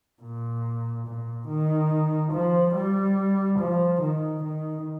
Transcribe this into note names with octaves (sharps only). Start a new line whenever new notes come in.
A#2
A#2
D#3
F3
G3
F3
D#3
D#3